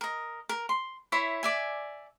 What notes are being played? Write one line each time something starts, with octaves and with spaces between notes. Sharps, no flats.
A#4 D#5
A#4
C6
E4 C#5 E5 C6
D5 E5 G#5